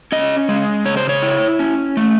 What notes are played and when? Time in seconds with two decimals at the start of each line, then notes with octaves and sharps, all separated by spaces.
0.12 C#4 D#5
0.49 G#3
0.85 C#3 C#5
0.97 C5
1.09 C#5
1.23 E4
1.59 C#4
1.97 A3